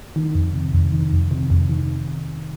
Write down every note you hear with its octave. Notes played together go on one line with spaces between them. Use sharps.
D#3
F2
C3
F2
D#3
F2
C3
F2
D#3